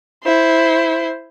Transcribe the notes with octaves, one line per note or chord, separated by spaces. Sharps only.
E4 C5